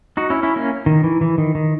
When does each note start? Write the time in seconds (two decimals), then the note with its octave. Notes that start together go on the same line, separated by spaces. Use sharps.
0.17 D#4 F#4
0.30 C#4 E4
0.43 C#4 E4
0.56 A#3 C#4
0.86 D#3
1.04 E3
1.21 E3
1.38 D#3
1.55 D#3